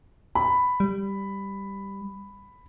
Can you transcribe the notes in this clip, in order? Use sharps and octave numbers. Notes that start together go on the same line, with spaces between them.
B5
G3